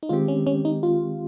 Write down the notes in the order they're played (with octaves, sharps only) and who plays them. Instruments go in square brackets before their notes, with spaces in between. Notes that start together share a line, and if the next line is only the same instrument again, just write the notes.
[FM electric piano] D#4
[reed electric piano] D#3 G#3 C4 G4 [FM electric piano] F4
[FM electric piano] C#4
C#4
D#4
F4